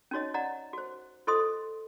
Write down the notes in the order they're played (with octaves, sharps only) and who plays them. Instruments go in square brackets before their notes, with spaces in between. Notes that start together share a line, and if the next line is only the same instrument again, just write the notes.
[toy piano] C#4 D#4 F#4 C#5 D#5
D5 D#5 F#5 A#5
F#4 C5
F4 A4 C5 D#5 C6 D#6